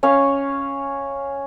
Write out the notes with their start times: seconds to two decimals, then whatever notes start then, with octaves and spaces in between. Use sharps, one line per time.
0.03 C#4 C#5 F5